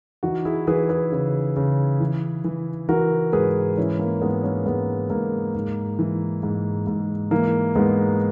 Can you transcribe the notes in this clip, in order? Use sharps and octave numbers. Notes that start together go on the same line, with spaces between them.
E3 D#4 F#4
E4 G#4
E3 G#4 B4
G#4 B4
C#3
C#3
E3
E3
E3 F#4 A#4
G#2 G#4 B4
E3 C#4 E4
A#3
G#2 G#3 B3
A#3 C#4
G#2 G#3 B3
G#2 A#3
G#2
E3
G#2
G#2
E3 A#3
G#2 G#3 B3